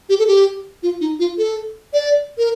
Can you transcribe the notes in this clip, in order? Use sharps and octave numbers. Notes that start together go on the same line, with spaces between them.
G4
A4
G4
F4
D#4
F4
A4
D5
A#4